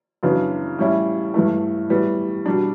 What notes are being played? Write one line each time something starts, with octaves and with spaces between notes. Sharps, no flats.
F#2 C#3 E3 B3 D4
A2 G3 C#4 E4
G2 E3 A3
A2 E3 G3 B3
B2 G3 D4